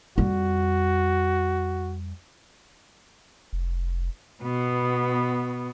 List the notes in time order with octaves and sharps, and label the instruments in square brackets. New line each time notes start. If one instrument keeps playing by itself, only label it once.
[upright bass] F2 G3 [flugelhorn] F#4
[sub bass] F1
[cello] B2 B3